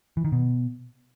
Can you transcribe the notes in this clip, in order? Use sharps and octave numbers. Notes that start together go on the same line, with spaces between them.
E3
D#3
B2